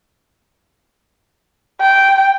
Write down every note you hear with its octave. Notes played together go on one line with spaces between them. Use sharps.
G5